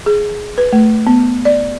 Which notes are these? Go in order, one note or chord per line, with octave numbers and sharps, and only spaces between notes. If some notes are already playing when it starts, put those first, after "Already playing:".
G#4
B4
A3
B3
D5